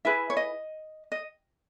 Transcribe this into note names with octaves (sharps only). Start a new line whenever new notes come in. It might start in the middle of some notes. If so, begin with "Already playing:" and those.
E4 G#4 B4 E5
C#5
D#5
D#5